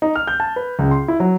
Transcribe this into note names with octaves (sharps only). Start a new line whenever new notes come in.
D#4
F6
G6
A5
B4
C#2
C6
E4
F#3